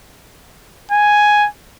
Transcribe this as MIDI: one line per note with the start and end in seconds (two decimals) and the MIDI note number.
0.92 1.47 80